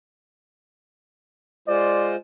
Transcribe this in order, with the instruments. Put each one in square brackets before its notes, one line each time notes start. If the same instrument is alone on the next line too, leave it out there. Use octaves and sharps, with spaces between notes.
[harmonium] G#3 F4 C5 [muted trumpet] D5